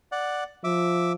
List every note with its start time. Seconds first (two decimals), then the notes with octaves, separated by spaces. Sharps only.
0.12 D5 F#5
0.64 F3 E5 D6